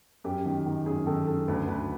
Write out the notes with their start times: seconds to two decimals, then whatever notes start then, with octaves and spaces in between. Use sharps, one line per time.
0.24 F#2 G4
0.46 D#3
0.66 D#3
0.86 F#2 G#4
1.06 D#3 A4
1.27 F#2 A4
1.48 D2 B4
1.67 D2 B4